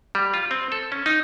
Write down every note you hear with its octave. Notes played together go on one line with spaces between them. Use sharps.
G3
F4
C4
A4
C#4
D#4